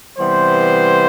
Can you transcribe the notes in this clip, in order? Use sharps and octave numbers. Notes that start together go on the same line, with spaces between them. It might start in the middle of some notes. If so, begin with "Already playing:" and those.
C3 E3 G3 B3 C5